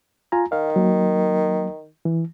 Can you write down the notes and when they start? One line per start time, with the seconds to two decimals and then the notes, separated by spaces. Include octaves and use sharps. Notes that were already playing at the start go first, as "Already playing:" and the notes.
0.32 F4 G#5 A#5
0.52 D#3 F5
0.76 F#3 A#3
2.05 E3